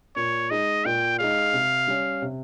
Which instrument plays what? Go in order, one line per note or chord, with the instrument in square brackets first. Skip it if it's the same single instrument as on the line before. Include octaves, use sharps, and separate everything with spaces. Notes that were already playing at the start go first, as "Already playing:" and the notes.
[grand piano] A#2 [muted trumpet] C#5
[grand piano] G#3 D#4 [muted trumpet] D#5
[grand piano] A#2 [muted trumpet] G5
[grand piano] G#3 D#4 [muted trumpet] F5
[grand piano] C3
G3 C#4
C3